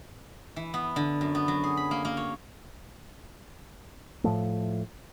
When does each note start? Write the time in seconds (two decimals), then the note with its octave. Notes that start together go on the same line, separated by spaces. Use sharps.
0.56 E3
0.74 B3
0.96 D3
1.21 F#2
1.35 B3
1.48 F#3
1.64 G#4
1.77 B5
1.91 A#3
2.05 A#3
2.17 C#5
4.24 A2 F3 A3